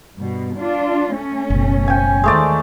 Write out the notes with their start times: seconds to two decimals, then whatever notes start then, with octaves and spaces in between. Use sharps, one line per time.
0.16 G2 B2
0.55 D4 F4
1.14 A3 C#4
1.50 F#1 B2
1.88 G5 G#5
2.24 D#2 D#3 G#3 A3 D5